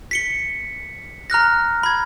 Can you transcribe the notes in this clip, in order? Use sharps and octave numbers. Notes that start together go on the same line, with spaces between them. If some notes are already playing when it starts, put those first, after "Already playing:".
B6 C#7 G7
A#5 F6 F#6 A#6
B5 G#6